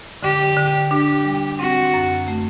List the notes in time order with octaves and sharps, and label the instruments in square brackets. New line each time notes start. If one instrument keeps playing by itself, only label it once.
[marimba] D3 [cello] G4
[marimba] D3
[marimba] D4 [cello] G4
[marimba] G3
[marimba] C4 [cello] F#4
[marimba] F#2
A3